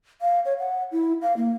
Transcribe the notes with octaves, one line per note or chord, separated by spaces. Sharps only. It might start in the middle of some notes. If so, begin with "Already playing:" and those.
F5
C#5
F#5
E4
F5
A#3